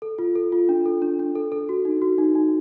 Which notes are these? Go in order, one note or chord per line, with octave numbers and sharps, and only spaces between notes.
A4
F4
A4
F4
D4
A4
D4
D4
A4
A4
F#4
D#4
F#4
D#4
D#4